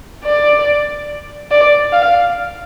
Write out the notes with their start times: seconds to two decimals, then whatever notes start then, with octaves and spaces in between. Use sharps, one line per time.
0.24 D5
1.51 D5
1.93 F5